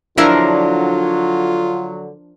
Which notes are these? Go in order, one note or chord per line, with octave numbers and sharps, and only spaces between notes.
D3 F3 F#3 D4 E4 F4 A#4